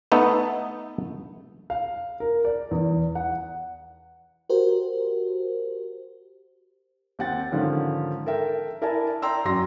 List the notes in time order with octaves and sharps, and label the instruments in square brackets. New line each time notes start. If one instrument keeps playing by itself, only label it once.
[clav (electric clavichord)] A3 B3 D#4 A4
[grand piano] F5
A#4
D5
E2
F#5
[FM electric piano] F#4 G4 A#4 C5
[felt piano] D#2 C4 F#5 G5 A6
G#2 D3 D#3 F3 C#4
A4 A#4 E5 G5
E4 A#4 D5 E5 G#5 A5
D5 G5 A#5 C6 E6
F#2 F#3 C6 A#6